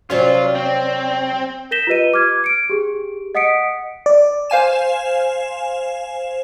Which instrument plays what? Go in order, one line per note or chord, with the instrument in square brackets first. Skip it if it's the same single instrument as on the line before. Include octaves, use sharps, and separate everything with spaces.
[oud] C3 F#3 C#4 [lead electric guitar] F4 [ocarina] D5
[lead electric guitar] C4
[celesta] A#4 G6 A#6 B6 E7 G7
F4 G4 B4 D#5 D#7
D6 F6 G#6
C#7 D7
G4 G#4
D#5 F#5 D#6 B6 C#7 D7
[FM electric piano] D5
[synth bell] C5 F5 G#5 E7